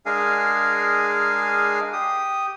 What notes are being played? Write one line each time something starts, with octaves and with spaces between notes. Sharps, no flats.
G#3 D4 G#4 A#4 F5 G#5
G4 D#6